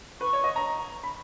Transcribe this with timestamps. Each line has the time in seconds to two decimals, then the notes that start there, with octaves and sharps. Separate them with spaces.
0.21 B4 C#6
0.33 C#5
0.44 D#5
0.56 A#5
1.04 B5